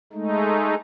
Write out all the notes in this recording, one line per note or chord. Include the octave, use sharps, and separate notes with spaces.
G#3 A3 D#4